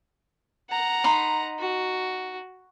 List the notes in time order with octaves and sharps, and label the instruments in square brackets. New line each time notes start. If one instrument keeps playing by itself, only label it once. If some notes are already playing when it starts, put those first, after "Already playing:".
[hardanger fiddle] F#5 A#5
[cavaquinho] D#4 B5 C6
[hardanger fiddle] F#4